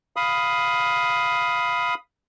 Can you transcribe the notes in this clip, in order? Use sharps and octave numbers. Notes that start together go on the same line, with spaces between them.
F5 B5 D#6